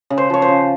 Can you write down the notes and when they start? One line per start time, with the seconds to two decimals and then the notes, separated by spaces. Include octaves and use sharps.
0.10 C#3
0.18 C5
0.30 F3 C#5
0.42 C5
0.48 C#3